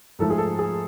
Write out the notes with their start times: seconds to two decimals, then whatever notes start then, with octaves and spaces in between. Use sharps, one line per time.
0.19 G#2 F3 A3 A4
0.30 G#4
0.38 A4
0.59 G#4